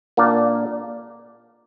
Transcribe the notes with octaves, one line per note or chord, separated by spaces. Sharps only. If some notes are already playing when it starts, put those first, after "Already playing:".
A#2 A#3 D4 A#4 D5